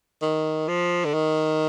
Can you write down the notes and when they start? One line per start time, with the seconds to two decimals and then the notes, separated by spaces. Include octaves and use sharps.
0.22 D#3
0.68 F3
1.05 D3
1.14 D#3